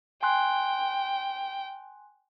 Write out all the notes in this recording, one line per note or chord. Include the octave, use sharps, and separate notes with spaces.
G5 G#5 C6 F#6